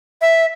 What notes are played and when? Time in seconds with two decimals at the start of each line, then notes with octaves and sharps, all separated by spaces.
0.22 E5